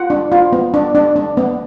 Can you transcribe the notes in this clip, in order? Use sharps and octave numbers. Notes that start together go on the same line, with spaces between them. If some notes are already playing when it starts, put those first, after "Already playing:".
Already playing: F4 F#5
D4
F4
B3
D4
D4
D4
B3